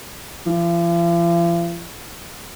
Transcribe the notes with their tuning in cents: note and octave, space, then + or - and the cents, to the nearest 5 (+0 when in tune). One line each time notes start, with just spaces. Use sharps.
F3 -45